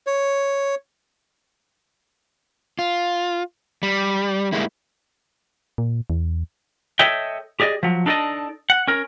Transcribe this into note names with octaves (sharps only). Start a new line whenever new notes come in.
C#5
F4
G3
G3 G#3 A#3 E4
A#2
E2
A4 C#5 D#5 E5 G5
G4 G#4 D5 D#5
F3 F#3
D4 D#4 A4 C5 D5 D#5
F#5
C#4 A#4